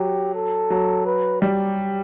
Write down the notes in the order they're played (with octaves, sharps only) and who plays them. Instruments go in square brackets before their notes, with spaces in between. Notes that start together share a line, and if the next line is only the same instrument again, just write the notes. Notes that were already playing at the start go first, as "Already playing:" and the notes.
Already playing: [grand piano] F#3 [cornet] G4
[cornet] A4
[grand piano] F#3
[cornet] B4
[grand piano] G3 [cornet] G4